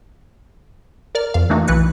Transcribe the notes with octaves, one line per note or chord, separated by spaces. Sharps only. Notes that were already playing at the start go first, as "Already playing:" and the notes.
A#4 D5 F6
F2 F5
E3 A3 A#3 D4 D#4 F#4
B1 E3 B4 F#6 C#7